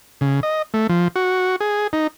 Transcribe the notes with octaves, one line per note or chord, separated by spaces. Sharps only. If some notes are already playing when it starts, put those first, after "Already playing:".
C#3
D#5
A3
F3
F#4
G#4
D#4